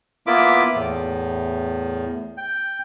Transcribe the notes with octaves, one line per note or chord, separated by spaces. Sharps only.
A#3 B3 E4 F4 E5 D6
E2 A2
G5